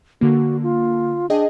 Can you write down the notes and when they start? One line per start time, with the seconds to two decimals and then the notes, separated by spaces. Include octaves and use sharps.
0.21 D3 A#3 F#4
0.63 F4
1.30 D4 G#4 D#5 G5